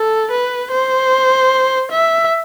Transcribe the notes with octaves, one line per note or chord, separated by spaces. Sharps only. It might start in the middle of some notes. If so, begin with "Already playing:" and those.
Already playing: A4
B4
C5
E5